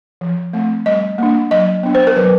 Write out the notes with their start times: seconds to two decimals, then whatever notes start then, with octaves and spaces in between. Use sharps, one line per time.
0.21 F3
0.53 A3 C4
0.86 G3 D#5
1.18 A#3 D4
1.51 F#3 D#5
1.83 B3 D4
1.95 C5
2.07 A#4
2.16 F#3 B4